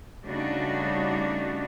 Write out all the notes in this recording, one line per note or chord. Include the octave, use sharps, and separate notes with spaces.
C#3 G3 A3 D4 D#4 F#4